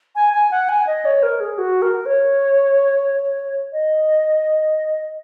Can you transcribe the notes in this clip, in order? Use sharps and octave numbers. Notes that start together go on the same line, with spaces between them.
G#5
G#5
F#5
G#5
D#5
C#5
A#4
G#4
F#4
A#4
C#5
D#5